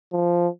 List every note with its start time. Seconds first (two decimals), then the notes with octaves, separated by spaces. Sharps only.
0.13 F3